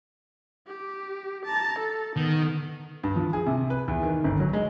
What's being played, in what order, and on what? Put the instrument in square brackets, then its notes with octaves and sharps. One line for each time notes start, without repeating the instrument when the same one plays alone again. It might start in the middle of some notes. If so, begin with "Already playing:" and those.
[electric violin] G4
A5 A#5
A4
[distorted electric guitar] D#3 [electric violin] B3
[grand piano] G2
F3
G#4
C3
B4
E2
D#3
G1
F#3
G#3